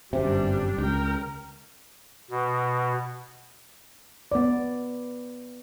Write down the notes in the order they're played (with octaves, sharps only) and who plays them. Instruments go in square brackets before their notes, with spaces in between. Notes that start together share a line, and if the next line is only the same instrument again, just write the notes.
[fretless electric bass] G1 F#2 C3 [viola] G3 D4
[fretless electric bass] C#2 [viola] A#4 G5
[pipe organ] B2
[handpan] B3 D5